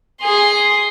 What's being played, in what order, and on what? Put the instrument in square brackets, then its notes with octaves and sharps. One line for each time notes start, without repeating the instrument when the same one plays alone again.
[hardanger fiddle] G#4 C6